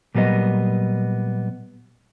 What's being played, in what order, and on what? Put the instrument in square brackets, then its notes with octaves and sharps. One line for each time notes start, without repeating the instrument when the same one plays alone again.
[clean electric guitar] A#2 F#3 G3 B3 D#5